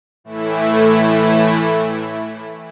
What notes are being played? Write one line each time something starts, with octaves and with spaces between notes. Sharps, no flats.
A2 E3 A3 E4